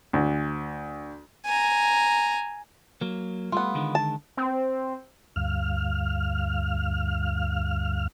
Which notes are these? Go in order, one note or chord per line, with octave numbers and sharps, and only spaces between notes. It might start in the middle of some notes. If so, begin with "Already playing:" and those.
D2
G#5 A#5
F#3 A#3
G3 A3 B3 F4
D3 D#3 G#3
A5
C4
D2 G2 F5 F6